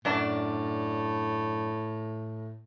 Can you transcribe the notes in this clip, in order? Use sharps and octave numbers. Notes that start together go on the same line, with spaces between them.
F#2 A2 D4 D5